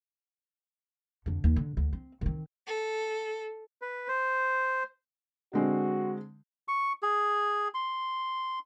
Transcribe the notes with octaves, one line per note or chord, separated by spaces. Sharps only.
F2 D3
D#2
D3
D2
C4
D#3 C4
A4
B4
C5
D3 G#3 C4 F#4
C#6
G#4
C6